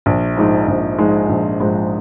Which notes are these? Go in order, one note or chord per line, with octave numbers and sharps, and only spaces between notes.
A#1
G#2 F3 G#3 D#4
A#1
G#2 F3 G#3 D#4
A#1
G#2 F3 G#3 D#4